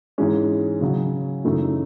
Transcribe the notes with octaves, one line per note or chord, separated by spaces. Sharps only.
G#2 E3 G#3 C#4
C#3 F#3 C#4
F#2 C#3 E3 A3 D#4